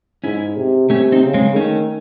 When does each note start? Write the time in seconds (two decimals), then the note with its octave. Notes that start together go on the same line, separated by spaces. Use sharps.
0.24 G#2 C#4 E4
0.57 C3
0.90 C3 A3 C#4
1.12 C4 D#4
1.24 C#3
1.34 G#3 C4
1.56 D#3 A3 C#4